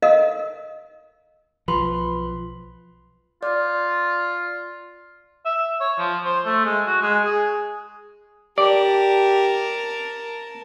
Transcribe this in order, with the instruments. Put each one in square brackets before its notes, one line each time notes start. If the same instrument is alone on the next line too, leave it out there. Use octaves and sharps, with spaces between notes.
[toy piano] A4 A#4 D#5 F5
[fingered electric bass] B1 F3 [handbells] B4 B5 C6
[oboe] F4 [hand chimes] D5
[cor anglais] E5
C#5
F3
C5
A3
G#3
F#4
G#3
G#4
[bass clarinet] G4 [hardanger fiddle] A#4 A5 [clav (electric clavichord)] D5